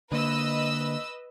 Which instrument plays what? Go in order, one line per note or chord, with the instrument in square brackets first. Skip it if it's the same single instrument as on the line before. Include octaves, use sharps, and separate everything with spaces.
[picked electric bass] D3 A#3 [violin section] B4 D#5 E6